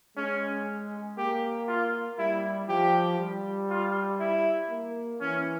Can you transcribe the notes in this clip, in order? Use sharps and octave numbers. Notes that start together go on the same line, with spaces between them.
G#3 C#4
A#3 G4
F4
G3 E4
F3 G4
G3
F4
E4
A#3
E3 C#4